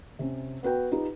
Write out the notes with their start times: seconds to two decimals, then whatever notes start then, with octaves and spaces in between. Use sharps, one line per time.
0.19 C3 C#4
0.63 B3 F#4 B4 G5
0.92 D#4 F4 G4 B4